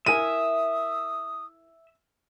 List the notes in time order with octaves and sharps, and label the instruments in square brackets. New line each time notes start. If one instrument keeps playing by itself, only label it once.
[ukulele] E4 A#4 G#5 [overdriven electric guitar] E5 [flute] D#6 [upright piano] D#7